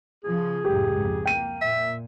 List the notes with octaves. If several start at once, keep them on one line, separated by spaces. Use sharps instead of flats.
C#3 F3 G#4
C#2 F#2 A2 G4
F2 G#2
A#3 G5 D#7
A#2 E5